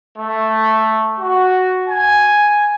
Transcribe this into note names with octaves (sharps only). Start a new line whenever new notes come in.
A3
F#4
G#5